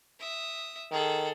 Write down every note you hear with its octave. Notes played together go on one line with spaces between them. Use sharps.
E5 D#6
D#3 G#4 A4